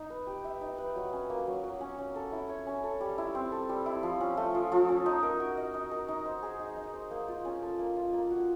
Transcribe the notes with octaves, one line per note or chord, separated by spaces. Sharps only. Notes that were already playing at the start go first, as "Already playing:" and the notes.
Already playing: D#4
B4
G4
E5
D#4
B4
F#3
C#4
A#3
F#3
F#3
C#4
C#4
A4
E4
C#5
C#4
A4
G3
E4
C4
A4
G3
E4
F3
C#4
A3
F3
F3
C#4
D#4
A#4
F#4
D#5
D#4
A#4
D#4
C5
G#4
D#4
D#4
C5
A#3
F4
C#4
A4
A#3
F4
A#3
F#4